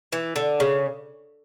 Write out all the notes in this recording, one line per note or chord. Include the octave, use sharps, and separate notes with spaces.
E3
D3
C#3